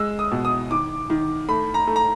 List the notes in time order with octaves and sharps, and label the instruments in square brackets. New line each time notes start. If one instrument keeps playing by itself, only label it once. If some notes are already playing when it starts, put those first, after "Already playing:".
Already playing: [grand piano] G#3 E6
D#6
B2
D#6
D#3 D6
D#3
A3 B5
A#5
A3
A#5